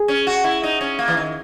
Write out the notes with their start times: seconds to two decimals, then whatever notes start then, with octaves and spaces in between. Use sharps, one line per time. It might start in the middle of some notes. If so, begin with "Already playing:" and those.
Already playing: G#4
0.08 C#4
0.27 F#4
0.44 E4
0.63 D#4
0.81 C#4
0.99 A#3
1.08 E3
1.17 D#3